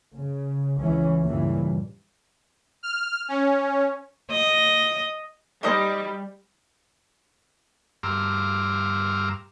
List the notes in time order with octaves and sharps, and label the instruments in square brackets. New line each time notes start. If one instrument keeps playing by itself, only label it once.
[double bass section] C#3
C#2 E3 C#4
C#2 G2 A#2 C#3 E3 G3
[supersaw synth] F6
C#4
[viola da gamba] D#5
[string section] G3 [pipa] D#4 C5 D#5
[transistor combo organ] G2 A#5 C6 D6 E6 F6